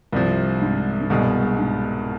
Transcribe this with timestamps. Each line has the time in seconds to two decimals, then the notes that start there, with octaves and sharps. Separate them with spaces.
0.12 C2 G2 C3 F3
0.62 G#2
1.01 G#2
1.10 C2 G2 B2 G#3
1.59 G#2